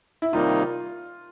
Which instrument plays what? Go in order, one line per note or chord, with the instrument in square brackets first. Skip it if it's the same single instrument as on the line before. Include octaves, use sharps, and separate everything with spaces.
[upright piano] E4
[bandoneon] C3 D#3 G3 A#3 D#4 [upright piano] F4